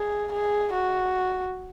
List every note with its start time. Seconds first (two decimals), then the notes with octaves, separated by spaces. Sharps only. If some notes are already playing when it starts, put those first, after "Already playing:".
Already playing: G#4
0.32 G#4
0.73 F#4